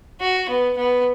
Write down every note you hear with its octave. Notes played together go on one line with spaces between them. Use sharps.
F#4
B3
B3